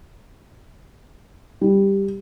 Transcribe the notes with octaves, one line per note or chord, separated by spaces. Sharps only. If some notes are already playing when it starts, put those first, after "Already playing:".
G3